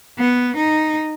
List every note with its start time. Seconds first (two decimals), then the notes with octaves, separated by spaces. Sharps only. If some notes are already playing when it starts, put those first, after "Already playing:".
0.19 B3
0.57 D#4